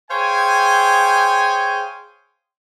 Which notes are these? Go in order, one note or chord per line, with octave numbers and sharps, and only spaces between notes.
G#4 C5 C#5 F5 G5 G#5